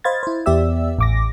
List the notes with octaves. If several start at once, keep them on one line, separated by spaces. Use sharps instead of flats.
C5 D#5 F5 B5 G#6 A6
E4 C5
E2 B3 G4 D5 E5 E6
A1 D6 A#6